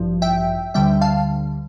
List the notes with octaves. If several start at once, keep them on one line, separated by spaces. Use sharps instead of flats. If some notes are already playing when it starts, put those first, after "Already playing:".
Already playing: A1 G2 F3
E5 G5
D2 D3 G3 E5 G5
F5 A5